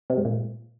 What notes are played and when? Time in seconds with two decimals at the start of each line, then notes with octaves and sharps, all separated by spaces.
0.10 C3
0.17 G#2
0.25 A#2